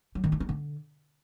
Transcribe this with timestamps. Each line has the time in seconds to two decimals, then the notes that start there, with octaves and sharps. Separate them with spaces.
0.15 F#3
0.24 D#3
0.32 D#4
0.40 B3
0.49 D3